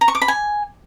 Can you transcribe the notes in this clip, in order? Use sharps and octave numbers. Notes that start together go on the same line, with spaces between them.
A#5
C#6
D6
B5
G#5